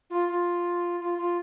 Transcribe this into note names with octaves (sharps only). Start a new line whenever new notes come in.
F4
F4
F4
F4